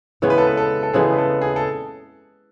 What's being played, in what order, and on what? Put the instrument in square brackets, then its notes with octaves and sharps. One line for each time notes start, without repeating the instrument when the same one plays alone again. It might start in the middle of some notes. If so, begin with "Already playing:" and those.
[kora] C#3 E3 G#3 B3 [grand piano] C#5
[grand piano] B4
A4
B4
A4
A4
[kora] C#3 E3 G#3 B3 [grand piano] G#4
[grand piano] B4
A4
G#4
A4